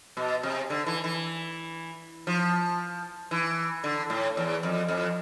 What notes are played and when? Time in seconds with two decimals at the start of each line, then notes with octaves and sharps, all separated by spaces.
0.17 B2
0.43 C3
0.70 D3
0.86 E3
1.04 E3
2.27 F3
3.31 E3
3.84 D3
4.10 A2
4.37 E2
4.63 F2
4.89 F2